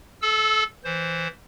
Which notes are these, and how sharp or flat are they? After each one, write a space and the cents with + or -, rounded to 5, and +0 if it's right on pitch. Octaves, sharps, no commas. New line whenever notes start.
A4 -25 E6 +0
E3 +0 C5 +0